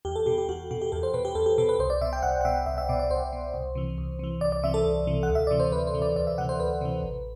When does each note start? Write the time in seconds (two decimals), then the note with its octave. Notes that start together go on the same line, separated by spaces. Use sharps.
0.05 E2 G4
0.16 A4
0.26 B2 G4
0.38 G4
0.49 E2 F#4
0.71 B2 F#4
0.82 G4
0.92 E2 A4
1.03 C5
1.14 B2 B4
1.25 G4
1.35 E2 A4
1.46 G4
1.58 B2 A4
1.69 B4
1.79 C2 C5
1.90 D5
2.01 B2 E5
2.13 G5
2.23 C2 F#5
2.41 F#5
2.45 B2 E5
2.66 C2 E5
2.78 E5
2.89 B2 D5
2.99 D5
3.10 C2 C5
3.33 B2
3.54 C2
3.75 C3 E3
3.98 C2
4.19 C3 E3
4.41 C2 D5
4.52 D5
4.63 C3 E3 E5
4.74 A4
4.84 C2
5.07 C3 E3
5.23 F#5
5.29 D2
5.35 E5
5.47 C3 E3 D5
5.60 C5
5.72 D2 B4
5.87 C5
5.94 C3 E3
6.02 D5
6.16 D2 D5
6.27 E5
6.38 C3 E3 F#5
6.49 C5
6.60 D2 B4
6.81 C3 E3
7.03 A1